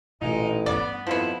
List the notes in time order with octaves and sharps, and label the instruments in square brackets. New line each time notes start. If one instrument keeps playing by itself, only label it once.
[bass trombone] A1 [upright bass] A#2 [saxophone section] G#3 D#4 F4
[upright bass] G2 C#4 [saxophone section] B3 [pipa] D5
[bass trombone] F2 [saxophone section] B2 D#3 E4 [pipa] F3 B3